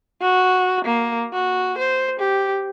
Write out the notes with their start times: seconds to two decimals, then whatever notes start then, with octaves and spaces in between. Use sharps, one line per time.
0.22 F#4
0.85 A#3
1.33 F#4
1.78 C5
2.20 G4